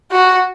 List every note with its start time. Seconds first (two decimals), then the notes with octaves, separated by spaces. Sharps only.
0.11 F#4